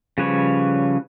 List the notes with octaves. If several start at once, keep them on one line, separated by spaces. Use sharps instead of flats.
C#3 F3 G3 B4 C#5